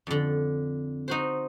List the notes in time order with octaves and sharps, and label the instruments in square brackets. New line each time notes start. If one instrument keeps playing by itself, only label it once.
[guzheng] F2 D3
D#4 F#4 C5